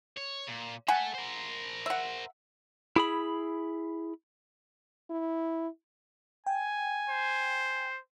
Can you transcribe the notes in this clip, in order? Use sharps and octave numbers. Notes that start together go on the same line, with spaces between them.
C#5
A#2
A4 E5 F#5 G#5
A#4 C5
E5 F#5
E4 G#4 B5
E4
G5 G#5
C5